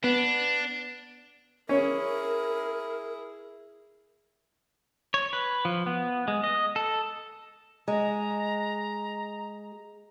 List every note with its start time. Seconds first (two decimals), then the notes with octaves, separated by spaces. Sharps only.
0.04 B3 D4
1.69 C#4 E4 G#4 A#4
5.14 C#5
5.33 B4
5.65 F3
5.87 B3
6.28 G#3
6.44 D#5
6.76 A4
7.88 G#3 A#5